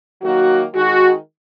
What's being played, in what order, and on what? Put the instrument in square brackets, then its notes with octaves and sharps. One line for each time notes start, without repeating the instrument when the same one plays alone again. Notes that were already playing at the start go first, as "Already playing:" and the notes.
[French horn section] D#3 F#3 A#3 F#4
D#3 G#3 D#4 F#4